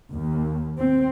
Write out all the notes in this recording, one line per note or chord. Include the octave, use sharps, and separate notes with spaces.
D#2
C4